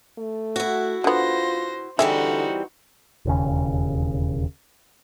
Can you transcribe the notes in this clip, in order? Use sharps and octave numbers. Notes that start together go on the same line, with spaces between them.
A3
E4 F#4
D3 B3 F4 C5 A#6
D3 E3 G3 C4 D#4 F#4 G#4 E5
E1 D#2 C#3